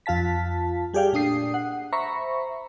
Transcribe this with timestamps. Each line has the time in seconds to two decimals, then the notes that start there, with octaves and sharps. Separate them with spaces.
0.06 F2 F4 F5 A5 B6
0.93 G3 G4 G#4 D5 F5 G5
1.13 A#2 A3 D4 D#6 C7
1.54 F#5
1.93 C5 E5 A#5 B5 C#6